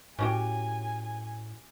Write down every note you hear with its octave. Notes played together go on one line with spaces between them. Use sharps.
A2 C#4 F#4 G4 G#5